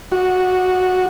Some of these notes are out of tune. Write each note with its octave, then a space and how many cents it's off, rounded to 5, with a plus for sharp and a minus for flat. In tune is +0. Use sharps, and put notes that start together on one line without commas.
F#4 -10